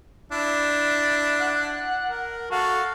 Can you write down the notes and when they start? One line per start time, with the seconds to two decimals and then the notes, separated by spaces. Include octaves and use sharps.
0.32 D4 E4
1.40 F#5
2.08 A#4
2.51 F#4 A4 F5